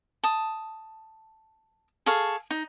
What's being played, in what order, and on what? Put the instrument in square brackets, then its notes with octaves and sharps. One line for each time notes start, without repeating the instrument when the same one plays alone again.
[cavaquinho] A5 D#6
G#4 A4 F5 C#6
D#4